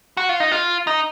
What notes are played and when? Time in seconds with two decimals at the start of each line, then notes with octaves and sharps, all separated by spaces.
0.17 F#4
0.29 F4
0.40 D#4
0.52 F4
0.87 D#4